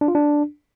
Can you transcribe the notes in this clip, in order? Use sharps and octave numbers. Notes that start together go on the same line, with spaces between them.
D4
F4
D4